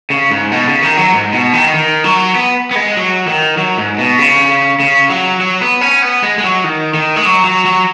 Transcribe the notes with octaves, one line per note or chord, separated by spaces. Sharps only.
C#3
G#2
B2
C#3
D#3
F#3
G#2
B2
D#3
D#3
F#3
B3
B3
G#3
F#3
D#3
F#3
G#2
B2
C#3
C#3
F#3
F#3
B3
C#4
B3
G#3
G#3
F#3
D#3
D#3
G#3
F#3
F#3
F#3